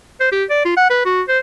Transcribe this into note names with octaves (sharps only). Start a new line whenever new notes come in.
C5
G4
D5
F4
F#5
B4
F#4
C5